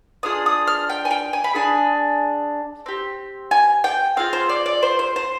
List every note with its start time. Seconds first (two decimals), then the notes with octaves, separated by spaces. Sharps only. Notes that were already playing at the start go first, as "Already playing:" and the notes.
0.23 D4 F4 G#4 D#6
0.46 D#6
0.67 F6
0.89 G5
1.05 G#5
1.11 G5
1.33 G#5
1.44 B5
1.55 D4 G#4 G#5
2.86 C4 G4
3.51 G#5
3.84 G5
4.17 C4 F4 G#4 F5
4.33 C5
4.49 D5
4.66 D5
4.83 C5
4.99 C5
5.16 C5